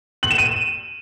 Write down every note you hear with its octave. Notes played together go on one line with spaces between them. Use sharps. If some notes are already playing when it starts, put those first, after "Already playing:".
F#7
E7
D#7